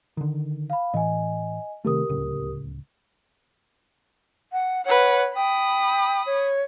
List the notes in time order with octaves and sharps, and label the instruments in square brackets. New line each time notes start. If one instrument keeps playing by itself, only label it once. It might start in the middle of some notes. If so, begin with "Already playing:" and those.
[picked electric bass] D3 D#3
[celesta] F5 B5
[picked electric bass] A2 E3 [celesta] D#5 G#5
[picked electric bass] C3 D#3 A3 [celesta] G4 A#4 D#6
[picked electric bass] D1 C#2
[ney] F#5
[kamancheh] B4 F#5 [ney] C#5
[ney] G5 [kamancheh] B5 D#6
[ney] C#5